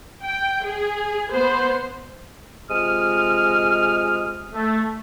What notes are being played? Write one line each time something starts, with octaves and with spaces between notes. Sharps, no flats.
G5
G#4
B3 C5
C3 G#3 F4 D#6 F6
A3